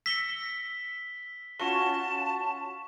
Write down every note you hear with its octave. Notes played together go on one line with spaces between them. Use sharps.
E6 A#6 B6 C#7 G7
C#4 F4 F#4 A5 C#6